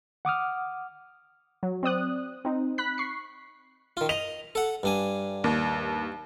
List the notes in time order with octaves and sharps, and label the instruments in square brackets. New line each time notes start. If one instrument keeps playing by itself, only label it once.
[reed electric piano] F#5 D6 D#6 F6
[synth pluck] F#3
C4 D5 D#6 F#6
C4 D#4
B5 F#6 B6
C#6 C7
[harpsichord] D#3 F4
[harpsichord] D#5 [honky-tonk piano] F7
[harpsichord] A4 F#5
G2 D4 G#5
[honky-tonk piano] D#2